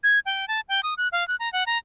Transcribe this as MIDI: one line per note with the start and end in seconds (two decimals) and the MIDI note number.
0.04 0.19 92
0.26 0.48 79
0.48 0.60 81
0.69 0.80 79
0.83 0.94 87
0.98 1.08 90
1.12 1.26 77
1.28 1.36 90
1.40 1.51 82
1.53 1.64 78
1.67 1.78 82